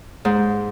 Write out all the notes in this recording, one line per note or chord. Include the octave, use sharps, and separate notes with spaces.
G#2